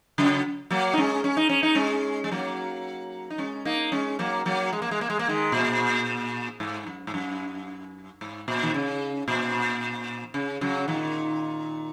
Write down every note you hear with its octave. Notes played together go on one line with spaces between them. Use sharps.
C#3 F#3
F#3 A#3
D#4
G#3 C#4
C#4
D#4
C#4
D#4
G#3 C#4
G#3
F#3 A#3
D#4
G#3 C#4
A#3 D#4
G#3 C#4
F#3 A#3
F#3 A#3
G#3
A#3
G#3
A#3
G#3
A#3
D#3 G#3
A#2
G#2
F#2
G#2
F#2
G#2
A#2
D#3
C#3
A#2
C#3
C#3 F#3
A#2 D#3